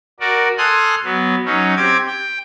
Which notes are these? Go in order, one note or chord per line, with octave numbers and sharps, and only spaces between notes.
F#4 A#4 D5
A4 G#5 C6 D#6 F6 F#6
F#3 B3
F#3 C#4 D#4
C4 G4 D6 G#6
G5